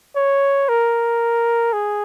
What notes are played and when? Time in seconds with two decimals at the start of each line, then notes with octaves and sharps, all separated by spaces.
0.16 C#5
0.69 A#4
1.73 G#4